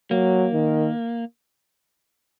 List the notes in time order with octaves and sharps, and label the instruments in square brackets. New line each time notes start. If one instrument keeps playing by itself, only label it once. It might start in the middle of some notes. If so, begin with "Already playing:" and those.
[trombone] F#3 [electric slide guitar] A#3
[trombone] D#3